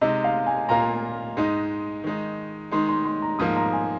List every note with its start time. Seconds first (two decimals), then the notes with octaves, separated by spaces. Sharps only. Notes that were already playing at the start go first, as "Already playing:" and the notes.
0.01 C3 G#3 D#4 D#5
0.24 F5
0.47 G#5
0.69 A#2 A#3 F4 A#5
1.37 G#2 G#3 D#4
2.04 D#3 G#3 D#4
2.71 D#3 G#3 D#4 C6
2.89 C6
3.05 C6
3.22 A#5
3.39 G#2 F3 A#3 D#6
3.57 A#5
3.73 G#5